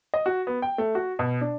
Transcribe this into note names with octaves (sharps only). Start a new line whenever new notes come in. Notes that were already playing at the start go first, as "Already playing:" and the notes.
D#5
F#4
B3
G5
A3
F#4
B2
D4